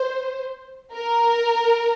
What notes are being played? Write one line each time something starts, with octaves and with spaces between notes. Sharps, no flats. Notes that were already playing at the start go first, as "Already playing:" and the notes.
Already playing: C5
A#4